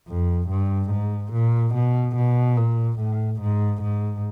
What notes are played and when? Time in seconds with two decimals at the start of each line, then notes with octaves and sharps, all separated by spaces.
0.09 F2
0.49 G2
0.91 G#2
1.33 A#2
1.75 B2
2.17 B2
2.57 A#2
3.00 A2
3.42 G#2
3.83 G#2